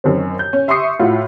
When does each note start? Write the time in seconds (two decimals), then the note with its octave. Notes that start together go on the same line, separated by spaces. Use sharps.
0.04 F#2 D#3 C4
0.39 G6
0.53 C#4
0.68 E5 C6 C#6 D#6 C7 C#7
0.99 A2 F4 F#4